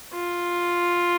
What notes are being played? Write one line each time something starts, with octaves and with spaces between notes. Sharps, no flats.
F4